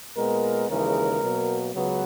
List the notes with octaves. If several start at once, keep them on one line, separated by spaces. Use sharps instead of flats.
A#2 G#3 B3 A#4
D#2 C#3 E3 G#3 A#4
B2 F#3 A#3
C#2 C#3 F#3 B3 B4